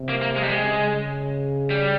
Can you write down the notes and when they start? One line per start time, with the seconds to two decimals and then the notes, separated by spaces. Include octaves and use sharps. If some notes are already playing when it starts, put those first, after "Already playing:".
Already playing: C3
0.09 A#3
0.22 A#3
0.36 G#3
0.43 G3
0.49 G#3
0.63 C#3
1.70 G3